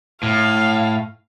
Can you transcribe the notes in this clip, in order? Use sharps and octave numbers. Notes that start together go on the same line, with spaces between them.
A2 F5